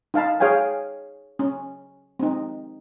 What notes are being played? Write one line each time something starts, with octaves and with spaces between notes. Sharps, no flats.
D#4 F5 A5 B5
G#4 C#5 F5 G5 G#5
C#4
C4 D#4